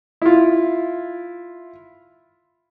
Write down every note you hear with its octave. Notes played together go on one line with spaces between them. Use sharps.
E4 F4